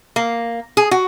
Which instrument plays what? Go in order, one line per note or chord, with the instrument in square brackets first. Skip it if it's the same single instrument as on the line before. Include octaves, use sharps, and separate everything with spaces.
[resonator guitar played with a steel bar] A#3
G#4
F#4